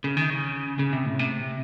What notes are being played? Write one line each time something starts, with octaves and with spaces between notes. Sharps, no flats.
C#3
D#3
C#3
C#3
C3
A2
C3